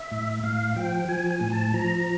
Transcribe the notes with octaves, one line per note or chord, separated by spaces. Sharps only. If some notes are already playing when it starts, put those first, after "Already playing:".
Already playing: E5
A2
A2 F5
F3 G5
F3 G#5
G#5
A2
A5
F3 A#5